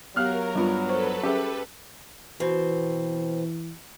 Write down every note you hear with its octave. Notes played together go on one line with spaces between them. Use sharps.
F#3 B3 G4 A#4 F5 F6 F#6
G2 G3 B3 F4
A4 B4 C5 C#6
C#4 G4 G#4 E5
B2 E3 C4